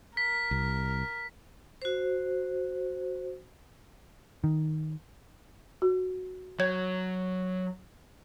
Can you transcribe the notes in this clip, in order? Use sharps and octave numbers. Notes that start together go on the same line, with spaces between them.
A#4 B6
C2
F#4 C5
D#3
F#4
F#3 C#5 G#6